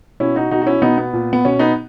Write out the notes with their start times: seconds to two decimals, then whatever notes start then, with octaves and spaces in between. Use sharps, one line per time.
0.20 B2 C#4 E4
0.36 D#4 F#4
0.51 B2 D#4 F#4
0.61 F#4
0.66 C#4 E4
0.82 B2 B3 D#4
0.98 B3
1.13 A#2
1.33 B3
1.45 B2 C#4
1.59 B3 D#4